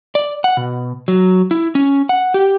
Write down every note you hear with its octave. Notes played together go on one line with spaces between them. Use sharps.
D5
F#5
B2
F#3
E4
C#4
F#5
G4